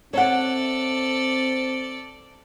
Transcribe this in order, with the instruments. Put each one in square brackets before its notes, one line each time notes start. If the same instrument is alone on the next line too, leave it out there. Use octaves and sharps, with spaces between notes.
[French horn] C4 [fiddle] A4 D5 [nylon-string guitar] C#5 E5 F#5